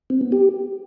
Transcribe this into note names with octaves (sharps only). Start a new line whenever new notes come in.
C4
B3
G4